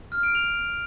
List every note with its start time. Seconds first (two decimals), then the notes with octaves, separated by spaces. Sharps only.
0.12 F6
0.23 D7
0.35 F7